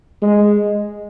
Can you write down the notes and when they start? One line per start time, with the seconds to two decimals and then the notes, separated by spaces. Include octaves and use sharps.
0.22 G#3